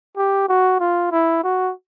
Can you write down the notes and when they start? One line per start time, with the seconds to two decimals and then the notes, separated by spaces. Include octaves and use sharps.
0.17 G4
0.49 F#4
0.80 F4
1.12 E4
1.44 F#4